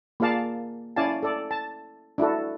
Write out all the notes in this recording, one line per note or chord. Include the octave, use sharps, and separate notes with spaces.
A#3 F4 G#4 D5 F5 A5
C#4 E4 D5 F5 G#5 A5
A4 D5
A5
D4 E4 F#4 A4